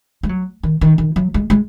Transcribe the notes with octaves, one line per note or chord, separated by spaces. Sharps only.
G#3
F#3
D#3
D#3
D#3
F#3
G#3
G#3